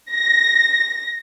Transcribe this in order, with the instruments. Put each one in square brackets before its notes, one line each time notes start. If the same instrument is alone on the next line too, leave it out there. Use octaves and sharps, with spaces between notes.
[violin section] A#6